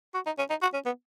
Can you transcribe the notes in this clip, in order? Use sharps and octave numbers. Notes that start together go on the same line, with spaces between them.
F#4
D#4
C#4
D#4
F#4
C#4
B3